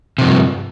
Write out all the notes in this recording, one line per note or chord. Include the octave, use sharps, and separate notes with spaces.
G2 C3 F3